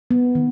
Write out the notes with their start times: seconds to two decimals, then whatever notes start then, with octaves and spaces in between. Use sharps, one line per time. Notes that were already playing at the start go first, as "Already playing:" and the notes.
0.11 B3
0.35 D#3